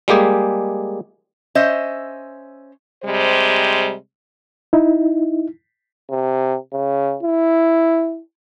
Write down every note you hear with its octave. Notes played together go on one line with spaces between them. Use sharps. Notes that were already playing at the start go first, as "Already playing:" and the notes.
G3 G#3 A#3 G4 G#4
C#4 C5 D#5 E5
C3 G3 G#3 C5
D#4 E4
C3
C#3
E4